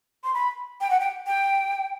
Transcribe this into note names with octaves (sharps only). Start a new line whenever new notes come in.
C6
B5
G5
F#5
G5
G5